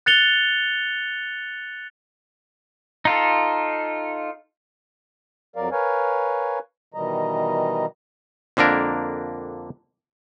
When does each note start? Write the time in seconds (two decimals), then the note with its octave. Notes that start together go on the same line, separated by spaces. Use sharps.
0.06 F#6 A6 C#7 F7 G7
3.05 D#4 F4 A4
5.56 F2 F#3 A#4 D5 F5
5.72 A#4 B4 C#5 F5 G#5
6.94 B2 D#3 E3 G3 D#5 A#5
8.57 F2 D3 A#3 D4 A#4